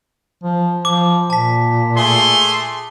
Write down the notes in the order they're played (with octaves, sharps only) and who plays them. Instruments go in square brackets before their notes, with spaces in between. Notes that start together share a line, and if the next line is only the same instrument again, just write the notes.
[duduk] F3
[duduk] F3 [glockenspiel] D6
[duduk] A#2 [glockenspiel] A5 B6
[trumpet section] A3 G#4 C6